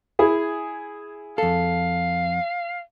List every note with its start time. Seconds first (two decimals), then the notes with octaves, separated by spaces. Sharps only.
0.19 E4 G#4
1.38 F2 A4 F5